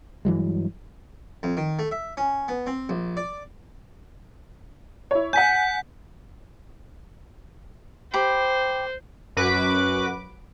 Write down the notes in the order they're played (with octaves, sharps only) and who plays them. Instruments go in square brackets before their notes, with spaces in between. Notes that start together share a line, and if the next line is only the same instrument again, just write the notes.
[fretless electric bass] G2 E3 F#3 G#3
[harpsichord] F2
D#3
A3
E5
C#4
B3
C4
A#1
D5
[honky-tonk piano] E4 C#5
[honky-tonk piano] F#5 G#5 [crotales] G6 B6
[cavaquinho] G4 B5 [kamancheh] C5
[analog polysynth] F#2 F#4 B4 D6